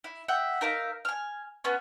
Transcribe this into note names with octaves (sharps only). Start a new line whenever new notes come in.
E4
E5 F#5 G5
D#4 A#4 E5 F5
G#5 F6
B3 C#4 C#5